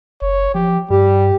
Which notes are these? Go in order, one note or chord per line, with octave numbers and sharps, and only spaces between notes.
F#1 C#5
F3 G4
G2 G3 G4